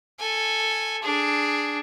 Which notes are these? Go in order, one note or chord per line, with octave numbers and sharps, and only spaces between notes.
A4 G#5
D4 G#4